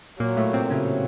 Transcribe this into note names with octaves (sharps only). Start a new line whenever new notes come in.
A#2 F#3 A#3
A2 A3
C3 C4
C#3 F#3 C#4